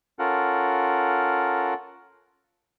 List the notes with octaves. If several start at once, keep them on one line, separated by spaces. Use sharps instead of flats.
C#4 F4 A4 A#4 F#5